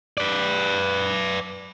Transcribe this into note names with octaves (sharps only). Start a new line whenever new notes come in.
B4 D5